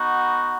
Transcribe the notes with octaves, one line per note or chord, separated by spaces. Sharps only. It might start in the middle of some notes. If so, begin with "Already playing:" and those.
Already playing: B3 D#4 F#4